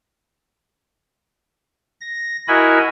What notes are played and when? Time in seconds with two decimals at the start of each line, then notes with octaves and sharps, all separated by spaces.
2.01 A#6
2.48 E4 F#4 A#4 D#5 G#5 B5